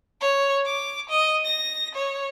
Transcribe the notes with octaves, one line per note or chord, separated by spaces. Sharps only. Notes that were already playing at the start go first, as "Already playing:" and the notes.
C#5
D6
D#5
A#6
C#5